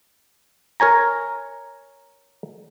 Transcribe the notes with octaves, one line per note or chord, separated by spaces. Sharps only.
A#4 C#5 G#5 A#5